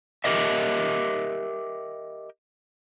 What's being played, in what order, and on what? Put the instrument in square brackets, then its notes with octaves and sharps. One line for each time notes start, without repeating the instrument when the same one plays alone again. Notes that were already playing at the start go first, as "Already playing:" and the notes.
[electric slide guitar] G4 A#4 D#5 E5